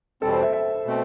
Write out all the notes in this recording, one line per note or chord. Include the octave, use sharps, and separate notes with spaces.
E2 B2 G3 C4 A4
C5
E5
E5
B2 A3 C4